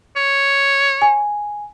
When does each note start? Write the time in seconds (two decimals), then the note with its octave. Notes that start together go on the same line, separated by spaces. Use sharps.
0.16 C#5
1.02 G#5